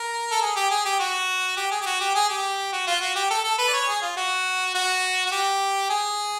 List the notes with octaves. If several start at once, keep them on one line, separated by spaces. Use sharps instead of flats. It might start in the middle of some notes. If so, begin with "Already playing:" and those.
Already playing: A#4
A4
G#4
G4
G#4
G4
F#4
G4
G#4
G4
F#4
G4
G#4
G4
F#4
F4
F#4
G4
A4
A4
B4
D5
C#5
G#4
F4
F#4
F#4
F#4
G4
G#4